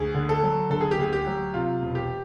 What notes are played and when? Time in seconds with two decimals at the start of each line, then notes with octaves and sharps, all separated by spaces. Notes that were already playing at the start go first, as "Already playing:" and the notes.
Already playing: D2 G#4
0.14 D3
0.29 A4
0.43 F#3
0.70 D3 A4
0.81 G#4
0.91 G4
0.98 D2 G#4
1.13 G4
1.27 F#3
1.54 C3 F4
1.82 E1
1.95 G4